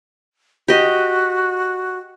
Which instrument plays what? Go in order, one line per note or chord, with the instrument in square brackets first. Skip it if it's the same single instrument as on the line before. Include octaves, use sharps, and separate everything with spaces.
[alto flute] F#4 [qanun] G4 D#5